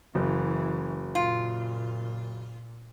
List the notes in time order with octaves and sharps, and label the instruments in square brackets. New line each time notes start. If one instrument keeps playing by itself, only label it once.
[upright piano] F#1 [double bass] E3
[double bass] A#2 [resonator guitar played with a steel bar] F4